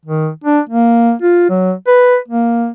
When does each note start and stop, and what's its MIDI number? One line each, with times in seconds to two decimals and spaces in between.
0.05 0.29 51
0.44 0.60 62
0.69 1.13 58
1.22 1.45 65
1.49 1.73 54
1.87 2.17 71
2.28 2.70 58